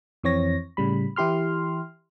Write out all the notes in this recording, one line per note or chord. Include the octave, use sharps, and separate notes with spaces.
F2 E3 C4 C#5 A#6
A2 C#3 G3 B5
E3 E4 G4 C6 F6